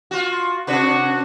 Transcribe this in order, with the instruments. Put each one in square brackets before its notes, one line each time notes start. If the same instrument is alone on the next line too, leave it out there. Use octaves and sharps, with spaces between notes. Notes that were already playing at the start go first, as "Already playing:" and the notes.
[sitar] F4 F#4
[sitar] C3 D4 B4 [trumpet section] F#4